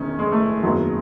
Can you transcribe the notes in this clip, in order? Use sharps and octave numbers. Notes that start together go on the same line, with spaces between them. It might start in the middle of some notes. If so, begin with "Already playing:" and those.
Already playing: E1 E2 D#3 C#4
G#3
A3
F#1 E2 D#3 F#3 G#3